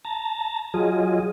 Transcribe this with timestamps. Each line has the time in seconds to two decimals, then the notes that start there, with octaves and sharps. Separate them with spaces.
0.05 A5 A#5
0.74 F#3 F4 G#4 D#5